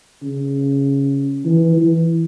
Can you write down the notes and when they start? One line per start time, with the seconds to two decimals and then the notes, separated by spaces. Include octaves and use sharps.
0.23 C#3
1.45 E3
1.75 E3